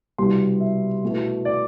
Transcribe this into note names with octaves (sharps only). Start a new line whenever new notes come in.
C2 B2 G3 C6
E5
B2 A3 E4
D5